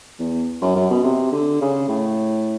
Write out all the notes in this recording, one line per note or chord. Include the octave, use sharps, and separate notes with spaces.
E2
F#2
F#2
B2
C3
D3
C#3
A2